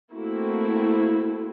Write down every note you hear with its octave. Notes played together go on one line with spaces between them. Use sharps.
A3 A#3 C4 E4 F#4